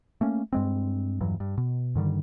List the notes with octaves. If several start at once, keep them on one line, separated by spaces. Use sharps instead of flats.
A3 A#3 C#4
G2 G#3 C4
E2 G2 E3 F#3
G2
B2
G2 D3 D#3 G3